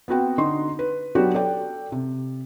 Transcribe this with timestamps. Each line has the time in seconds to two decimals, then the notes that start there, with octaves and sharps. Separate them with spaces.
0.08 B3 C4 F#4 G5
0.38 D3 D#4 C6
0.79 B4
1.15 F#3 B3 D4 F#4 G4
1.34 A4 D5 G5
1.92 C3